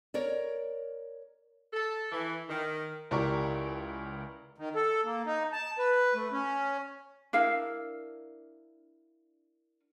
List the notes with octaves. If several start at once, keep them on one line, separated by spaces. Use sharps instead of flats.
A#4 C#5 D5
A4
E3
D#3
C#2 E4 G4 A#4 D5 C#6
D#3
A4
A#3
D#4
A5
B4
A3
C#4
D4 E4 A#4 F5